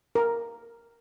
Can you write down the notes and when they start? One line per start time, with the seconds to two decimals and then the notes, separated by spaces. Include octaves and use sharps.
0.15 A#4